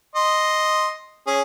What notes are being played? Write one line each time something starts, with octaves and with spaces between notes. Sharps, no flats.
D#5 C6
C#4 G#4